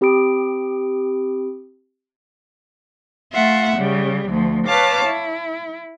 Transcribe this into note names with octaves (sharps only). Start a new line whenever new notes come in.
C4 G4 B5 D#6 D7
A3 F4 E5 F#5
C#3 G3
D2 F3
B4 C#5 F5 A5 D6 F6
E4